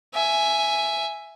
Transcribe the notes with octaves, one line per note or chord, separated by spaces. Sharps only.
E5 G#5